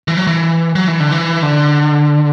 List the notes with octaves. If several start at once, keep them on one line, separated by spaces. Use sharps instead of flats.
E3
F#3
E3
F#3
E3
D3
E3
D3